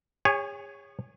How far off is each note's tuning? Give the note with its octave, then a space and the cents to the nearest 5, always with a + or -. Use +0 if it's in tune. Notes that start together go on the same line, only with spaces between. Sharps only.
G#4 -40 C#5 +0 G#5 +0